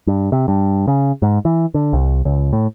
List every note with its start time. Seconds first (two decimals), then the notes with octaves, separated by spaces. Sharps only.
0.07 G2
0.32 C3
0.48 G2
0.88 C#3
1.22 G#2
1.45 E3
1.74 D3
1.93 C2
2.25 C#2
2.53 A2